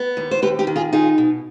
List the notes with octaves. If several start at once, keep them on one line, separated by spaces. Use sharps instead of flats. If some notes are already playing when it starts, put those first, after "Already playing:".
Already playing: B3
D#2
C5
D#2 G4 B4
D#4 G4
D#3
F4 G#4
D#4 F4 G#4
B2